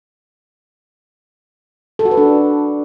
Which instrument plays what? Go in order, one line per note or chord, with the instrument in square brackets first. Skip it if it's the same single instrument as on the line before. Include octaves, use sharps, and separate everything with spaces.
[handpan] A4
F#4
B4
D4